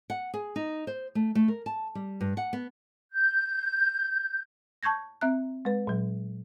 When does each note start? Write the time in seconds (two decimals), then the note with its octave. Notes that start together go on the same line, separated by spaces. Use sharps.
0.10 F#5
0.34 G#4
0.56 D#4
0.87 C5
1.15 A3
1.35 A3
1.48 A#4
1.66 A5
1.95 G3
2.21 G2
2.37 F#5
2.53 B3
3.11 G6
4.83 A5 C#6 G6 G#6 A#6
5.21 C4 E5 A#5 F#6
5.65 G#3 B4
5.87 A#2 F#3